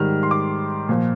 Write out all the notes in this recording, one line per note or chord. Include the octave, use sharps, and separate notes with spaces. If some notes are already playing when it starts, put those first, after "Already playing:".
Already playing: G#2 D#3 G3 F6
C6
D6
A#2 F3